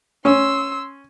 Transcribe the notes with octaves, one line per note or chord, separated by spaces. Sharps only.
C#4 C6 E6